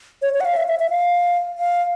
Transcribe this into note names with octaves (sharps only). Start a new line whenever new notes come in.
C#5
C#5
F#5
F5
E5
E5
E5
F5
F5